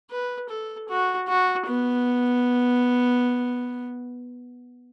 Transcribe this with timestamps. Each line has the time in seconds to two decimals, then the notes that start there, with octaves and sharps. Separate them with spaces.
0.11 B4
0.50 A4
0.89 F#4
1.29 F#4
1.67 B3